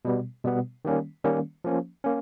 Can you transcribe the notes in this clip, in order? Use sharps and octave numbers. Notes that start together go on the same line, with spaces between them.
B2 G3 B3
B2 G3 B3
D#3 G3 A#3 C#4
D#3 G3 A#3 C#4
F3 A#3 C#4
A#3 C#4